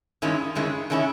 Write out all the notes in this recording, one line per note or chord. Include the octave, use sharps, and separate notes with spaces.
G2 D#3 G#3 C#4 E4
G2 D#3 G#3 C#4 E4
D#3 G#3 C#4 E4